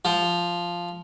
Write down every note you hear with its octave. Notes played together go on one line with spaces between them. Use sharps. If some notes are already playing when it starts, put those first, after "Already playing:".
F3